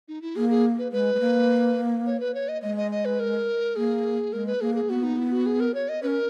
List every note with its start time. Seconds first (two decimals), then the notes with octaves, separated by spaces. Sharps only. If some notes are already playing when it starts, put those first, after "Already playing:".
0.08 D#4
0.21 E4
0.36 A#3 G#4
0.50 G#4
0.78 B4
0.92 G#3 B4
1.15 G#3
1.20 A#3
2.06 C#5
2.20 B4
2.34 C#5
2.48 D#5
2.62 G#3 D#5
2.77 D#5
2.91 D#5
3.05 B4
3.19 A#4
3.76 A#3 G#4
4.33 G#3 A#4
4.46 B4
4.60 A#3 G#4
4.75 G#4
4.89 B3 F#4
5.03 D#4
5.18 E4
5.32 F#4
5.46 G#4
5.60 A#4
5.74 C#5
5.89 D#5
6.03 C#4 A#4 B4